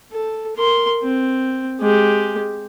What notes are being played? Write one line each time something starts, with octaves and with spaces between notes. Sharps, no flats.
A4
A#4 C6
C4
G#3 G4